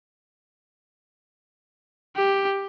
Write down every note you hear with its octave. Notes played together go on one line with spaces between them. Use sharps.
G4